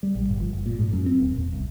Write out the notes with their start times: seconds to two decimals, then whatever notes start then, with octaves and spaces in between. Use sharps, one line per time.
0.03 G3
0.15 A#1
0.29 G1
0.40 F3
0.53 F#1
0.66 A#2
0.79 G#2
0.93 F#2
1.06 C4
1.20 D#1
1.36 E1
1.53 C2